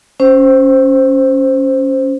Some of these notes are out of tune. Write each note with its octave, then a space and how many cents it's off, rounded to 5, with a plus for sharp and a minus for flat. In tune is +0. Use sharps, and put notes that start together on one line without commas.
C#4 +0 C5 +0